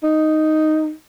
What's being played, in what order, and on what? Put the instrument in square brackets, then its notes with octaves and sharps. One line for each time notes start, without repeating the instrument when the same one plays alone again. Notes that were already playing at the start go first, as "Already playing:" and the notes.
[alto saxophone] D#4